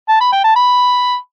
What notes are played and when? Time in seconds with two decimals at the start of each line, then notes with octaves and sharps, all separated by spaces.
0.08 A5
0.20 B5
0.32 G5
0.44 A5
0.56 B5